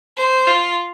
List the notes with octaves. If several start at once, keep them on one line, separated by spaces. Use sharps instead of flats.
C5
F4